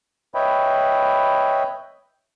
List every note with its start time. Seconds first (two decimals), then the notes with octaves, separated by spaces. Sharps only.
0.35 B4 C#5 D#5 E5 G5 B5